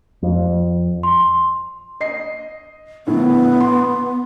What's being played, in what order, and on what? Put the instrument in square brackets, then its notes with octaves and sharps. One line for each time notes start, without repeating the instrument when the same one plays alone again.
[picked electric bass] F2
[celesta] C6
[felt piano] D#5 C7
[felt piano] A#1 A2 D3 [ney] B3
[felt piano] C6